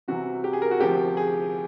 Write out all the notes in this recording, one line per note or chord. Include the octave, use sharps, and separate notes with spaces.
C2 C3 E3 F#4
G4
G#4
A#4
F#4
D2 C3 F3 G4
G#4